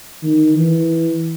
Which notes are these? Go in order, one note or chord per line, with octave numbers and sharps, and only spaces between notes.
D#3
E3